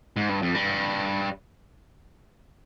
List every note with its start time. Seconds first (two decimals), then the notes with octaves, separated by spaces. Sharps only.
0.17 G#2
0.29 G2
0.42 F2
0.55 G2